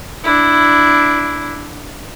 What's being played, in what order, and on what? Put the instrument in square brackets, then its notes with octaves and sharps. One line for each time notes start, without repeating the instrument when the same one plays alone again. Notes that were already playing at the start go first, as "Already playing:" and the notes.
[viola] D4 E4